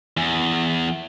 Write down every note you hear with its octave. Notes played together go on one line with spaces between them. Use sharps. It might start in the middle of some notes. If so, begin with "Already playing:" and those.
E2